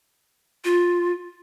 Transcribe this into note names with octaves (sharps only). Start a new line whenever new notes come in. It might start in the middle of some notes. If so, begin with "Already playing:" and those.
F4